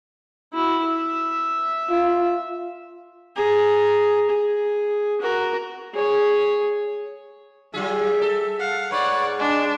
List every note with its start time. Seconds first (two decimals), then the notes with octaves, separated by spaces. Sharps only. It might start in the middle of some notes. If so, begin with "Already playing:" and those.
0.53 E4 F#4
0.86 E5
1.90 F4
3.37 G#4 A#5
4.30 G#4
5.21 F#4 A#4
5.94 G#4 C#5
7.74 F#3 G3 F4 G#4 E5
8.21 A4
8.59 F5 F#5
8.91 G#2 B4 C#5 D5 F#5
9.39 G#3 D4